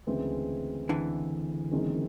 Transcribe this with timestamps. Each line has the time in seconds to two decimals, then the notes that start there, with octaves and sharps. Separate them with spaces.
0.07 D2 C#3 E3 G#3 C4
0.89 D3 E3
1.71 F#1 F#2 D#3 G#3 C4